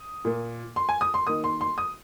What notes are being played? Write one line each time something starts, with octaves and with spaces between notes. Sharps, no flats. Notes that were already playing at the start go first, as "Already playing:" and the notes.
Already playing: D#6
A#2 A#3
C6
G#5
D#6
C6
D#3 A#3 D#6
C6
C6
D#6